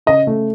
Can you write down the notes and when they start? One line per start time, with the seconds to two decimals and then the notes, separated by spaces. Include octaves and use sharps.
0.06 C#3 D#5
0.27 A3